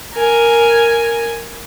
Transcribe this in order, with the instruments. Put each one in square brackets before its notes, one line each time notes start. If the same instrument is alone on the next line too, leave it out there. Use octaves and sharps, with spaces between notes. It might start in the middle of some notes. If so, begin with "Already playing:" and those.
[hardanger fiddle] A#4 G#5